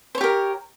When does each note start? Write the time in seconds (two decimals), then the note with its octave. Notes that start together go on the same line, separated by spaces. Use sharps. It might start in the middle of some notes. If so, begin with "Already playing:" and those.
0.15 C5
0.18 C#5
0.21 G4
0.24 A#4